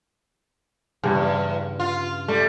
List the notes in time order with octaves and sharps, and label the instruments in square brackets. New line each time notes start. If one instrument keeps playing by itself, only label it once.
[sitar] E2 [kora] G2 C#3
[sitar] F4
[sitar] G3 [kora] A3